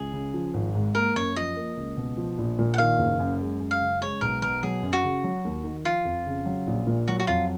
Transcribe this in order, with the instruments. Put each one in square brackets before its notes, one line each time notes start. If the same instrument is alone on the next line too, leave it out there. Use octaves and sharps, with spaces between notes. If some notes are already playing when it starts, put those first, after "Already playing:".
Already playing: [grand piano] C#2 [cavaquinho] G#4
[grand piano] C#3
F3
G#1
G#2
[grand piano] A#3 [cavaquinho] A#4
[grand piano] F#2 [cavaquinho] C#5
[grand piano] F3 [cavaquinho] D#5
[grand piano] A#3
C#2
B2
F3
A#1
A#2
[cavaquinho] F#5
[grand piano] D#3 [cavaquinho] F5
[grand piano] F#1
F#2
G#3
F#2
[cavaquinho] F5
[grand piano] C#3
[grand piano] G#3 [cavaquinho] C#5
[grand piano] B1 [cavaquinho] A#4
[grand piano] B2 [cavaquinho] A#4
[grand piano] F#3 [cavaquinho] G#4
[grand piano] F#2
[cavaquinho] F#4
[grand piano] C#3
F#3
D#2
D#3
[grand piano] F3 [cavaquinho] F4
[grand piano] F2
C#3
F#3
A#1
A#2
[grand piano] F#3 [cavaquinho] F#4
[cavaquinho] F#4
[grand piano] F2 [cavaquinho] F4